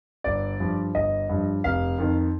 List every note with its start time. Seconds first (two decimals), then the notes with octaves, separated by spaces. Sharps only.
0.24 G1 D5
0.60 G2 F3
0.95 G1 D#5
1.29 G2 F3
1.64 F1 F5
1.98 F2 D#3